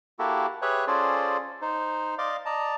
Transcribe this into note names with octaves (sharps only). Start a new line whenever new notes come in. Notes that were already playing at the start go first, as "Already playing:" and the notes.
A#3 E4 F#4 G4 A4
G4 G#4 B4 C#5 E5 F#6
C#4 F4 G#4 A4 C5 D5
D#4 C5
D5 D#5 F5 C6 D6
D5 D#5 A5 A#5